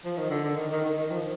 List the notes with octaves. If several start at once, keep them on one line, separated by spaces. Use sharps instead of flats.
F3
D#3
D3
D3
D#3
D#3
D#3
D#3
F3